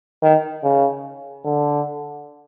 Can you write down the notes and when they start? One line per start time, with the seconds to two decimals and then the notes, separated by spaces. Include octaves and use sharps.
0.22 D#3
0.63 C#3
1.45 D3